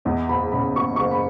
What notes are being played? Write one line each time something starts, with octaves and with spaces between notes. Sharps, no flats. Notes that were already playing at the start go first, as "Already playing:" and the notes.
E2 D#5
F#1 B5
C#3 B5
F#1 C#6
F#1 C#6
B5